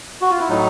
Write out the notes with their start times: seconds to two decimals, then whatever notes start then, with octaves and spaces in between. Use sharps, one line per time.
0.21 F#4
0.30 F4
0.40 E4
0.48 A2 F#3 D#4